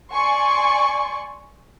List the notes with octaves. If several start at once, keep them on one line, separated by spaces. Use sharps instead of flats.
D5 G#5 C6 C#6